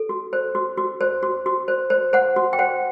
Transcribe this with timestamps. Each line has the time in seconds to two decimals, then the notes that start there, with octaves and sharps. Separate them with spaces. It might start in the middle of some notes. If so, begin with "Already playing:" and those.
Already playing: A4
0.09 F#4
0.33 C5
0.55 F#4
0.77 F#4
1.01 C5
1.23 F#4
1.46 F#4
1.68 C5
1.90 C5
2.13 C5 F#5
2.36 F#4
2.53 G5
2.59 C5 F#5